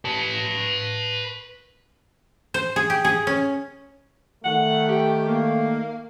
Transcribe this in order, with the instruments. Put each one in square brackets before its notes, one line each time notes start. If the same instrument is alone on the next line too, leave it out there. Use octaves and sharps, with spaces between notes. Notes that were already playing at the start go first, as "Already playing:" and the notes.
[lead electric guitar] B4 A5
[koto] C5
G#4
G4
G#4
C#4
[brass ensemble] D#3 A3 [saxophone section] F#5
[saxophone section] G4
A#3